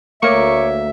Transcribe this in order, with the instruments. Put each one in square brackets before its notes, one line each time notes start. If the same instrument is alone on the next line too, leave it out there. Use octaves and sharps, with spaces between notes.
[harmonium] D2 E5 [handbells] A3 C#5 D6 [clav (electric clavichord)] A#3 A#4 [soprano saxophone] C#6